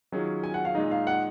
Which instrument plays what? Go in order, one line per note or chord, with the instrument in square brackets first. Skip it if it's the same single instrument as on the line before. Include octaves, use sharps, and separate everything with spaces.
[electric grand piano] D#3 F#3 C#4 F4 G#4
[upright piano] G#5
F#5
F5
[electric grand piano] A#2 G#3 D#4 [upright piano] D#5
[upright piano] F5
F#5